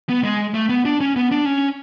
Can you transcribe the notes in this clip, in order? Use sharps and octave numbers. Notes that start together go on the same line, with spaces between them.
B3
G#3
A3
B3
D4
C#4
B3
D4
C#4